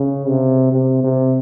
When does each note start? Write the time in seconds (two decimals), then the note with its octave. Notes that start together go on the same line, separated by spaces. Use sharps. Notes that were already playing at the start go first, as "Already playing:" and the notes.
Already playing: C#3
0.27 C3
0.72 C3
1.03 C3